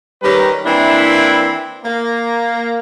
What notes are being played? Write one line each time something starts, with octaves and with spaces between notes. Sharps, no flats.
D#3 G3 C#4 G4 B4 A#5
E3 A#3 C4 D4 E4
A#3